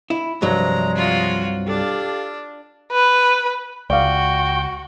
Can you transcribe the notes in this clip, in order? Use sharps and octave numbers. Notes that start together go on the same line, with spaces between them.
E4
C2 G2 C3 F3 F#3 G#3 A#5
F4 F#4
D4 G4 A4 F5
B4
C#2 F#4 D5 F5 G5